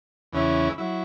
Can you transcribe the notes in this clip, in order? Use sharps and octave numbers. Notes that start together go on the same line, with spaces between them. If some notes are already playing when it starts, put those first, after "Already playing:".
E2 C#3 E3 C#4 E4
F#3 E4